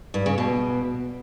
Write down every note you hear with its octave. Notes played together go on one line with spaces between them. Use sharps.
G2
C#3
B2